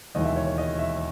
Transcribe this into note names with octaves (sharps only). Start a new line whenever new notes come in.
E1 D#2 C#3 E3 G#3 D#5
E5
C#5
C#5
D#5
E5